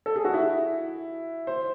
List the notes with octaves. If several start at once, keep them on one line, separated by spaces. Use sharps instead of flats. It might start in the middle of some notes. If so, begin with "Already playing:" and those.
A4
G#4
F#4
E4
C5